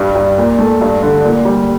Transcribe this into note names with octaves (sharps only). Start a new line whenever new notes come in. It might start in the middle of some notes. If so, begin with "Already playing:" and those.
Already playing: G2 G3
G2
A#2
A3
G2
D3
A#2
G3